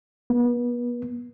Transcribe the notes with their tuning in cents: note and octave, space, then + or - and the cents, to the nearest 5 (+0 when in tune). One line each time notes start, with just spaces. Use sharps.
B3 -35